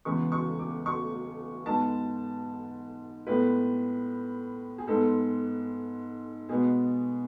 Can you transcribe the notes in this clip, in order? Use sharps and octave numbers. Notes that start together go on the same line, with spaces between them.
E2 C#3 G#3 B3 C#6
C#6
D6
C#6
G#2 G#3 B3 A5
A2 G#3 B3 B4
G#4
G#2 G#3 B3 A4
B2 G#3 B3 G#4